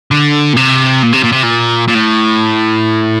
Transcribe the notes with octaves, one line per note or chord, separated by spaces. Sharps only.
D3
A#2
C3
A#2
C3
A#2
C3
A#2
A#2
A2